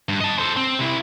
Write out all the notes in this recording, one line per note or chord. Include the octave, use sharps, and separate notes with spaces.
G2
D#5 A5
A4 C5
C4
C3 E4